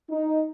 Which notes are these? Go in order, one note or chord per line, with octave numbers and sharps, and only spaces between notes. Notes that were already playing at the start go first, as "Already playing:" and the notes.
D#4